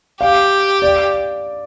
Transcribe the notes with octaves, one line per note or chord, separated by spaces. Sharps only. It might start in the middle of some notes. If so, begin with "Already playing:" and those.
G4 F5
D5